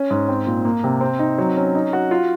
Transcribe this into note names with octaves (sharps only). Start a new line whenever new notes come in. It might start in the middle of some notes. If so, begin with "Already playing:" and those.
Already playing: C#4
G#2
C4
A#2
A#3
C3
C4
D#4
F#3
C#4
D#4
F#4
F4